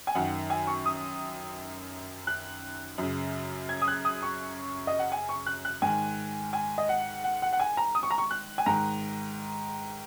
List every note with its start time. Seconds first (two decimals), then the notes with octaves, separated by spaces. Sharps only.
0.07 G#5
0.15 F#2 D#3 F#5
0.50 G#5
0.67 C#6
0.86 D#6
2.27 F#6
2.98 F#2 C#3
3.69 G#6
3.82 D#6
3.88 F#6
4.05 D#6
4.23 C#6
4.87 D#5
4.99 F#5
5.12 G#5
5.29 C#6
5.46 F#6
5.65 F#6
5.82 G#2 D#3 G#5
6.53 G#5
6.78 D#5
6.89 F#5
7.24 F#5
7.42 F#5
7.53 F#5
7.60 G#5
7.77 A#5
7.95 D#6
8.03 C#6
8.11 A#5
8.18 C#6
8.31 F#6
8.58 G#5
8.66 G#2 D#3 A#5